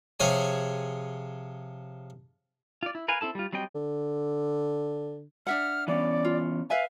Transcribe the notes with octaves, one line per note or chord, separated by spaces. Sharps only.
C3 F3 G#4 C#5 G#5
F4 D5
E4
A#4 B4 F5 G#5
C4 E4 A4 A5
G3 F4
F#3 G3 C4 D#5 G5
D3
D4 E5 F#5 F6
E3 B3 C#4 D5
F4
B4 E5 F5 G#5